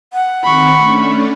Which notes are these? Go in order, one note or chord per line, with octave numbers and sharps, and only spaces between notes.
F#5
D#3 C4 B5 C#6
A3 C#4 D4